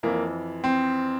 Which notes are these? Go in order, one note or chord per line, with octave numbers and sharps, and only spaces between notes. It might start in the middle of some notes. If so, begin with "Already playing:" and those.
F2 E3 A#3
C4